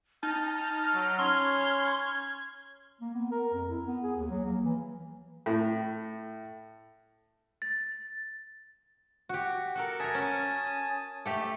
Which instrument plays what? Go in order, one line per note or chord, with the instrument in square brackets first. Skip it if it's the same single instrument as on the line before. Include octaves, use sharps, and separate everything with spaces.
[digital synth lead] D#4 [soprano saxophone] A5 [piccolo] F6
[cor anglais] F#3
[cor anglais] C#4 [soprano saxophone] C6 [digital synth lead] G#6
[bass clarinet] A#3
B3
A#4
F2
E4
B3
G#4
D#2
F#3
A#3
E3
[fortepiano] A2
[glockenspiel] A6
[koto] F#4 G4
F#4 A4 A#4
[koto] A#4 E5 [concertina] G#5 A5 D#6
[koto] C#4
[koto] A3 G4 A4 [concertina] E5 D6